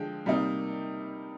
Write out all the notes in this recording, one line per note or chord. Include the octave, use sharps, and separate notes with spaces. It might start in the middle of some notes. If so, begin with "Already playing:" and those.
Already playing: D3 F3 G#3 G5
C3 G3 A#3 D#4